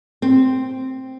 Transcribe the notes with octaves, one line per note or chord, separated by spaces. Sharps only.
C4